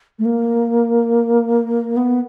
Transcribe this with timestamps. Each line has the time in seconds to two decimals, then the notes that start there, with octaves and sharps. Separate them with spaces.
0.19 A3
0.25 A#3
1.97 B3